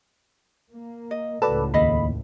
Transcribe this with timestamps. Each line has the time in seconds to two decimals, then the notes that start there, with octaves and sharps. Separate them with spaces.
0.72 A#3
1.11 D#5
1.42 C#2 A2 F#4 A4 B4 D5 A5
1.74 D#2 A4 D#5 F5 B5